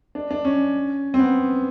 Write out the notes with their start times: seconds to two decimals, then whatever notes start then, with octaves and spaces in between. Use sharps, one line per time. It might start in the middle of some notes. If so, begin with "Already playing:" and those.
0.15 D4
0.31 D4
0.45 C#4
1.14 C4
1.19 B3